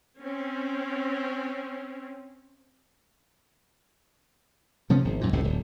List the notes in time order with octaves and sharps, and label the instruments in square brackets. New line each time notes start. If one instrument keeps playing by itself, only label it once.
[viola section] C4 C#4
[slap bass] C3 F3 B3 C#4
G#1
F#2 A#2
G1 C#2 A2 C3
D1